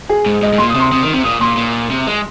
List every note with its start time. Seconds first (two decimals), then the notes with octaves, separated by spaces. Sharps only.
0.09 G#4
0.26 G#2
0.42 G#2 D#5
0.53 G#2
0.58 A#2 C6
0.70 D#6
0.75 C3 C6
0.92 C3 D#6
1.03 D#3
1.14 C3
1.24 A#2 D#6
1.41 A#2 C6
1.57 A#2
1.91 C3
2.07 G#3